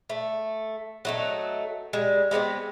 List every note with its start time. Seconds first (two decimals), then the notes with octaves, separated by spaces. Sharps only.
0.09 A3
1.05 F#3 A3 D#4
1.93 G3 G#3
2.31 G#3 B3 C4 G4